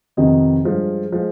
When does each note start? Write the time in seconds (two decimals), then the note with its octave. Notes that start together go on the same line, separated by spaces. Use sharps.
0.17 F2 C3 D#3 B3 D#5
0.64 G2 F3 G#3
1.12 F3 G#3